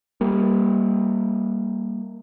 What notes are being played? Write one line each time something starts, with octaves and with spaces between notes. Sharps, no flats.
G3 A#3